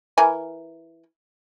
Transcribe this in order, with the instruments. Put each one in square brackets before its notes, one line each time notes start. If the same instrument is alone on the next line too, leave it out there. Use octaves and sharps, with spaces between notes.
[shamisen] E3 A#4 G#5